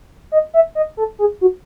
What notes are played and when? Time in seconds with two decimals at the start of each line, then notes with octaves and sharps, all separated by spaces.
0.32 D#5
0.54 E5
0.75 D#5
0.97 A4
1.19 G#4
1.41 F#4